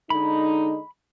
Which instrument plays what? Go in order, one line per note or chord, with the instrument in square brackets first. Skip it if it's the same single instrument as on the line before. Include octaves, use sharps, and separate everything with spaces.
[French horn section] D3 G#3 D#4 [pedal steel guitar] B5